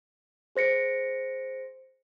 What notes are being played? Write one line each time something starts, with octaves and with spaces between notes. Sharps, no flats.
G#4 C5 A#6 C#7 D7